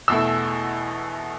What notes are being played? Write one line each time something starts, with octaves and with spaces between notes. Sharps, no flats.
E2 B2 A3 E4 E6